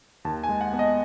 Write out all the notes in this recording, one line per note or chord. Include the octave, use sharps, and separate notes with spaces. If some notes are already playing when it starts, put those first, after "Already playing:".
D#2 A5
G#5
G#3
F#5
B3
D#5